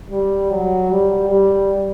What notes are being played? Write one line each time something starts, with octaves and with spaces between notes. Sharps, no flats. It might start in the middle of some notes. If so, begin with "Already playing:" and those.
G3
F#3
G3
G3